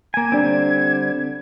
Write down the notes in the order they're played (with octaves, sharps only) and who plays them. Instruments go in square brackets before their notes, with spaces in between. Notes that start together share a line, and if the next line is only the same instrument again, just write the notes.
[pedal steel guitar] A#3 G#5 [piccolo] G#6
[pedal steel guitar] D3 G3 C4 [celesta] D4 D5